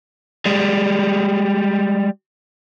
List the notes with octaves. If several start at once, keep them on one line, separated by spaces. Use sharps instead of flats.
G3 G#3